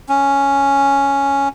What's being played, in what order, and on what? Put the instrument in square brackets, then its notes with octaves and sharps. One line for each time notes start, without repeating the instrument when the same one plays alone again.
[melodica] C#4